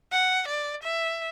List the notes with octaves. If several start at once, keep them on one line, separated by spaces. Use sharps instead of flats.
F#5
D5
E5